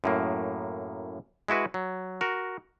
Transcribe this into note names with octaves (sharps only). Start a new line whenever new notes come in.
F#2 A2 A#3
G#3 E4 F#4 B4
F#3
F#4 A#4